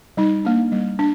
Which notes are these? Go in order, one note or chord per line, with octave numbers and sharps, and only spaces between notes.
G3 D#4
A#3 D4
G3
D4